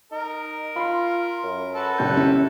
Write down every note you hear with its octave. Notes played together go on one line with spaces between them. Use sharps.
D#4 A#4
F4 B5 C6
F#2
F#4 A4 B4
F#1 G4 G6
C#4 E4